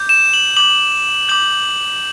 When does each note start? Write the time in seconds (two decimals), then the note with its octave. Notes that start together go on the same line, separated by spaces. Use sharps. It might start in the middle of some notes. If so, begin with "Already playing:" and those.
Already playing: D6 G6
0.09 E7
0.33 F#7
0.57 D6 G6 F#7
1.29 D6 G6 F#7